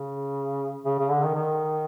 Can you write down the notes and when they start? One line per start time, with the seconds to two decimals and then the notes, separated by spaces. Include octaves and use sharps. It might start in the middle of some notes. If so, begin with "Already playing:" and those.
Already playing: C#3
0.85 C#3
0.99 C#3
1.10 D3
1.23 D#3
1.34 D#3